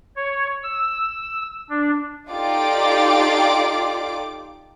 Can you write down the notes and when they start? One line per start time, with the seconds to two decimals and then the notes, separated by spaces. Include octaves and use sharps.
0.16 C#5
0.63 E6
1.70 D4
2.30 D#4 F4 G4 A4 D5 D6